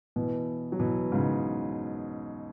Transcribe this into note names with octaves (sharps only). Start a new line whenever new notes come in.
B2 E3
F#3
B2 E3
G#2 C#3